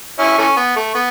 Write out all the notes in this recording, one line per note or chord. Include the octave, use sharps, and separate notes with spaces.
C#4 E4
E3 A3 C#4
B3
A3
B3